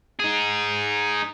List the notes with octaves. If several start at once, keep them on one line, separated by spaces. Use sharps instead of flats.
D#4 G#4